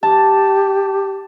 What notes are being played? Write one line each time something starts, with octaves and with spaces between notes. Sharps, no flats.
G4 A5